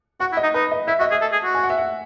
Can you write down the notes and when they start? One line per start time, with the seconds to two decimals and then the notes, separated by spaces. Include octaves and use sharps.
0.20 F#4 F#5
0.32 E4
0.37 D#5
0.43 D#4
0.54 D#4 B4
0.72 D#5
0.88 E4 E5
1.00 F#4 D#5
1.11 G#4 E5
1.21 A4
1.33 G#4
1.44 F#4
1.55 G#5
1.63 F#5
1.70 E5
1.78 F#5